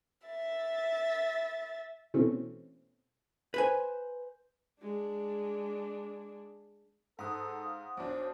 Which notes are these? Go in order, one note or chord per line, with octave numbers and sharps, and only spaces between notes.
E5 A6
B2 E3 A3 C4 C#4
B4 C5 G#5
G#3 D4
G#2 A4 F#5 D#6
F5
B1 D4 C5 D6